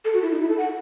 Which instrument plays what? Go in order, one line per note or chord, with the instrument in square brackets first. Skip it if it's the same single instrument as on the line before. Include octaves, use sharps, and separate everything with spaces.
[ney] A4
F#4
E4
D#4
E4
A4
F#5